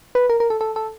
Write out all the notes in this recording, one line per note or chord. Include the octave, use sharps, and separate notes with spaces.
B4
A#4
A#4
A4
A4
A4